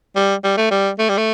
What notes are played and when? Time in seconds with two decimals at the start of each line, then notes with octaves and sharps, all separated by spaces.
0.16 G3
0.44 G3
0.57 A3
0.71 G3
0.99 A3
1.09 G3
1.18 A3